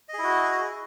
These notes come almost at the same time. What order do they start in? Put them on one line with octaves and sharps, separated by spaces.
D#5 G#4 E4 F#4